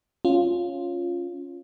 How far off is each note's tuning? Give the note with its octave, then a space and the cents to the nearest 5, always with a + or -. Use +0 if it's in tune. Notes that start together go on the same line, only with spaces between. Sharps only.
C#4 +0 F4 +0